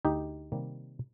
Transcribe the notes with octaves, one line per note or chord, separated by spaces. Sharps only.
D2 D#4 G4
C3 D#3 G3 A#3